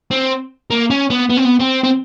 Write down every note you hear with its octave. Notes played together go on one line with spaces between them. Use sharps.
C4
A#3
C#4
B3
B3
C4
B3
C4
C4